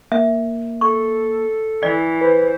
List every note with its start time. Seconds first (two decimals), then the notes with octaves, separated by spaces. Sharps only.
0.12 A#3 E5
0.81 A4 C#6
1.83 E3 D5
2.21 B4 C5